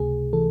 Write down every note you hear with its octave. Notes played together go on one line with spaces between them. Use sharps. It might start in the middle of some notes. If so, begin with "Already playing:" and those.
Already playing: C#2 C3 A3 G#4
E3 A4